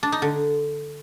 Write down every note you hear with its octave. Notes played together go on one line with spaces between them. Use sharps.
D4
D#4
D3